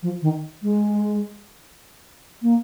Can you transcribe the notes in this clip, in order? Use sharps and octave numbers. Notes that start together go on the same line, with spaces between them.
F3
D#3
G#3
A#3